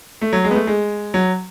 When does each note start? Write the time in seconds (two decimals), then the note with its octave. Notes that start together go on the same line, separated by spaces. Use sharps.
0.21 A3
0.33 F#3
0.45 G#3
0.51 B3
0.55 A3
0.67 G#3
1.14 F#3